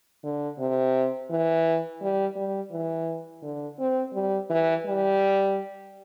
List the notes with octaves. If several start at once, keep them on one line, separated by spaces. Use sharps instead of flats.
D3
C3
E3
G3
G3
E3
D3
C4
G3
E3
G3